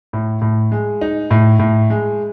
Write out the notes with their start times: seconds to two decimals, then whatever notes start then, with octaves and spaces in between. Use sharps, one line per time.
0.13 A2
0.41 A2
0.72 G#3
1.01 D#4
1.31 A2
1.59 A2
1.90 G#3